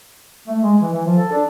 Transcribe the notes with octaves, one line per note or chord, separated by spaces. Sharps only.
A3
G#3
E3
E3
F3
A4
D4